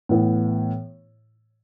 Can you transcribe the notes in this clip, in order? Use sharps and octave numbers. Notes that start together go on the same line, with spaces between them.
A2 E3 B3 E4